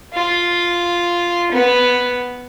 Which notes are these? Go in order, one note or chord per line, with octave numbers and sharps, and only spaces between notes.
F4
B3